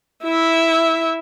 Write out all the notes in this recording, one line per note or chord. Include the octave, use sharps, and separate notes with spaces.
E4 E5